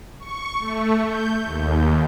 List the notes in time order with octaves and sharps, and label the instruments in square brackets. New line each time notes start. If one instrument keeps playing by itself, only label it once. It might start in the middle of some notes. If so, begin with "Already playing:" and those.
[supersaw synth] C#6
A3
G6
D#2